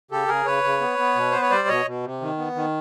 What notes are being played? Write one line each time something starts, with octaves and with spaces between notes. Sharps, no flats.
C#3 G4 A4
C#3 G#4 A#4
C#3 B4 C#5
C#3
B3
B3
B2
B3 C5
C#5
G3 C5 D5
B2 C#5 D#5
B2
C3
D#3
B3
D#3